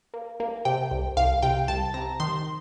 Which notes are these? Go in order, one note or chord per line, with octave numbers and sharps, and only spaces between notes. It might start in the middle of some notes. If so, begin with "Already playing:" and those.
A#3
A#3
C3 G5
C2
C2 F5
C3 G5
C2 A5
C3 A#5
D#3 C6